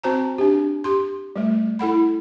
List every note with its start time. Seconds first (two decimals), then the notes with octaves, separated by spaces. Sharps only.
0.04 C4 F#4 C5 A5 A#5
0.38 D4 G4
0.84 G4 C6
1.36 G3 A3
1.79 E4 A4 F#5 B5